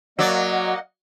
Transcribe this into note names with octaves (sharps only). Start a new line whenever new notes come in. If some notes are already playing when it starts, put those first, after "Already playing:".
F#3 A#3 D5 D#5 F#5